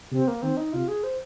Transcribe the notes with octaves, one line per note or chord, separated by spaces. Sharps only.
C3 C4
A#3
D#3 C4
D#4
C3 F4
G#4
C5